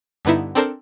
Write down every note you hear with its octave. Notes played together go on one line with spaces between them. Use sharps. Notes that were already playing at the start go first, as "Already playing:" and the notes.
G2 D3 B3 D#4 E4
C4 D4 A4 A#4 C5